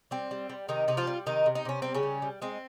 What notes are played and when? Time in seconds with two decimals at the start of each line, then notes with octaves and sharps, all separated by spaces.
0.11 G3 C4
0.31 G3
0.49 G3
0.68 C3 D#3 D#4
0.88 C3 D#4
0.97 F3 F4
1.07 G3
1.26 C3 D#3 D#4
1.46 C3
1.55 D#4
1.65 C3 C#4
1.82 G3 C4
1.94 C#3 C#4
2.03 G3
2.22 G3
2.42 G#3 C4